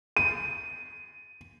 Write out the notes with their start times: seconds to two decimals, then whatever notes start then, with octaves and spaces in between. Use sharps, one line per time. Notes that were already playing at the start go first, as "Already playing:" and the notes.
0.17 D#7